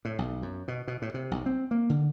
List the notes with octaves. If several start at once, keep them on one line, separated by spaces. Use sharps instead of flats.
A2
B1
F#2
B2
B2
A2
C3
B1
C4
A#3
D3